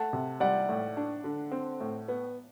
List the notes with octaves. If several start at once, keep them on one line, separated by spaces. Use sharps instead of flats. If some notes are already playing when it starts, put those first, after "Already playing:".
Already playing: A3 F#5 A5
C3
G3 D5 F#5
A2
D4
D3
C4
A2
B3